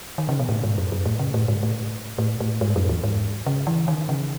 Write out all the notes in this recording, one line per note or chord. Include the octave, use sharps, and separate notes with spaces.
D#3
C#3
B2
A2
G#2
F#2
F#2
A2
C#3
A2
G#2
A2
A2
A2
G#2
F#2
E2
G#2
C#3
E3
D#3
C#3